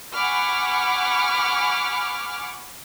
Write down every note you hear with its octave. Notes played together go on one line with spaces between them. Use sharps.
F#5 G#5 B5 C#6 D6 F6